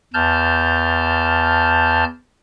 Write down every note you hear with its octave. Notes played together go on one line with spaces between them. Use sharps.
E2 A5 F6 G6